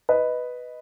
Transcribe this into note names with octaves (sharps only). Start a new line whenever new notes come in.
B4 D#5